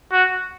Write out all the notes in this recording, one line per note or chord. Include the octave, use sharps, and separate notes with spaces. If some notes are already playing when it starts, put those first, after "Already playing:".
F#4